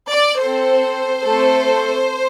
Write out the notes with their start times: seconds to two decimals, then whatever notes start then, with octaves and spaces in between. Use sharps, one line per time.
0.10 D5
0.39 C4 A4 C5
1.24 A3 C4 A4